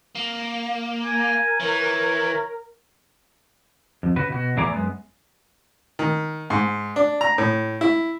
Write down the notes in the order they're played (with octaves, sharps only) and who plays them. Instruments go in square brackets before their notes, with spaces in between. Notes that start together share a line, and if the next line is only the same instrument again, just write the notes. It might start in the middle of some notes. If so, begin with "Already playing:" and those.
[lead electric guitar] A#3
[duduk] A#4 [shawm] G#5
[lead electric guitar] E3 [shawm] C#5
[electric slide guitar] F2
C#3 F#4 B4
B2 F#4
E2 A2 E4 G#4 D5 A#5
F#2 G#3 B3
[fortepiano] D#3
G#2
D4
A#5
A2
E4